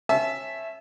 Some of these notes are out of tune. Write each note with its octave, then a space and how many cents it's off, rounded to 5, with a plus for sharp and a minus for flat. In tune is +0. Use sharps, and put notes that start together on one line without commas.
C#4 -30 E5 +0 A5 -30